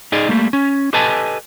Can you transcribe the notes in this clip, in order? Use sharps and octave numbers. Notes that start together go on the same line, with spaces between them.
D#4 G#4 D5 D#5
G3 A3 A#3
C#4
G4 A4 B4 D#5 G#5 A5